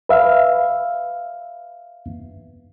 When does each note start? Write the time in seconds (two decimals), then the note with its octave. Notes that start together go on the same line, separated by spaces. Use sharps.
0.09 B4 E5 F5